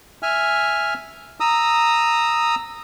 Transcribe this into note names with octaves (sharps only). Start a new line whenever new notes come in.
E5 G#5 F6
A#5 D#6 E6